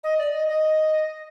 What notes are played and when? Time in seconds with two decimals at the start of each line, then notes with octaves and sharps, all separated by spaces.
0.04 D#5
0.18 D5
0.34 D#5
0.49 D#5